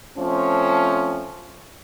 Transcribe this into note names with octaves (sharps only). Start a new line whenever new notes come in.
F3 A3 C4 C#4